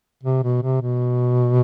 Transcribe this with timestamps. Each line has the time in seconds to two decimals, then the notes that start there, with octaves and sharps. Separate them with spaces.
0.23 C3
0.43 B2
0.63 C3
0.82 B2